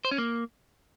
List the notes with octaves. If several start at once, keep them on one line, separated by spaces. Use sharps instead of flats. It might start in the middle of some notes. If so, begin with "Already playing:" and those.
C5
C#4
A#3